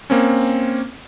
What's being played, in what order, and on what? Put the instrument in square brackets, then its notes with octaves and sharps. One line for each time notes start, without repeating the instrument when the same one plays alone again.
[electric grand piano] A#3 C4 C#4